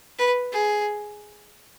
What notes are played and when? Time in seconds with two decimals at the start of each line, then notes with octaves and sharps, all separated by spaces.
0.18 B4
0.52 G#4